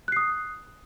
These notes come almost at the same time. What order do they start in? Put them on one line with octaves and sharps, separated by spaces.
F#6 C7 D#6